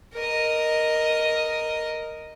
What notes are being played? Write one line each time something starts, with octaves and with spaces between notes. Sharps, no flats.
A#4 D#5